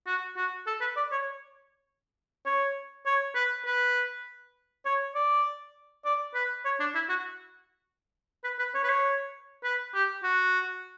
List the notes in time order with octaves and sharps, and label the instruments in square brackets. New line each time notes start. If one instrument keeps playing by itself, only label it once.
[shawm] F#4
F#4
A4
B4
D5
C#5
C#5
C#5
B4
B4
C#5
D5
D5
B4
C#5
D4
E4
F#4
B4
B4
C#5
B4
C#5
B4
G4
F#4